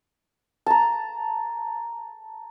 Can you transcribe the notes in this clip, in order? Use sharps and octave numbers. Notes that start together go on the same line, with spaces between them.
A5 A#5